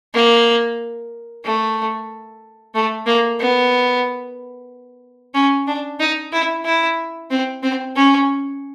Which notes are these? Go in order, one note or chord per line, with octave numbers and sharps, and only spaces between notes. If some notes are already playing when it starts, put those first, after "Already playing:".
A#3
A3
A3
A#3
B3
C#4
D4
D#4
E4
E4
C4
C4
C#4